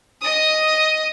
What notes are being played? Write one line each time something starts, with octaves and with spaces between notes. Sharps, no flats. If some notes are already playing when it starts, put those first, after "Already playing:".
D#5 D#6